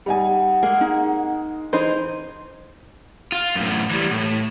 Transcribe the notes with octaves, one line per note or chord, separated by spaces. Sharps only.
G3 D#4 F#5 G#5
G#3 A#3 G#4
D#4
E3 D#4 G#4 C5
F4
F#2 A2
E3 G3
A2